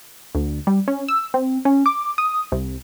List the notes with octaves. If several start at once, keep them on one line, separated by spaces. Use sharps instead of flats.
D2
G3
C#4
E6
C4
C#4
D6
D#6
C2